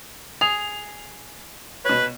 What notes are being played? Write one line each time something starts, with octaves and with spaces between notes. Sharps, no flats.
G#4 F7
B2 B4 C#5